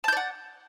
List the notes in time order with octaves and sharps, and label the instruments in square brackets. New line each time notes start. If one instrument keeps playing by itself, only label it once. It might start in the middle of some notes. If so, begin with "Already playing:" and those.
[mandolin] A5
G6
D5
F#5